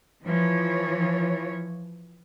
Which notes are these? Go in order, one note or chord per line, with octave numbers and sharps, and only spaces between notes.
E3 F3 C#5